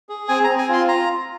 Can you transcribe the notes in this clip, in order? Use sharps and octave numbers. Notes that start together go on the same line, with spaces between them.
G#4
C4 G#5
A#5
C4
G#5
F4 C6
F4 A#5